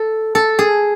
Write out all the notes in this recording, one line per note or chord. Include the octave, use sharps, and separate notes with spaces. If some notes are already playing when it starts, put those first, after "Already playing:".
Already playing: A4
A4
G#4